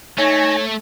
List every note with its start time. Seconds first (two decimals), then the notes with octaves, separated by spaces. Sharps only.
0.18 A3 D#4 C#5 G#5 A#6